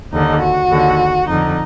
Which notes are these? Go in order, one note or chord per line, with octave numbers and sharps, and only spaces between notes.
D#2 D3 D#4
F#4
D#2 D3
F2 D3 D#4